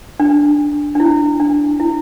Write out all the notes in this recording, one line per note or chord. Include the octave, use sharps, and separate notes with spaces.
D4
D4
E4
D4
E4